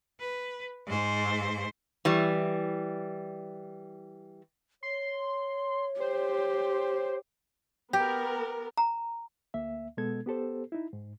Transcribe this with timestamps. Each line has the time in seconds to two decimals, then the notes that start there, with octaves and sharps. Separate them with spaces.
0.20 B4
0.87 G#2 C5
2.05 E3 G3
4.83 C#5 C6
6.00 G4 C5
7.93 B3 G4 A#4
8.78 A#5
9.54 D2 A#3 E5
9.97 B2 G#3 B3 A4 G#6
10.26 B3 G4 A4 C5
10.72 D#4 E4
10.93 G#2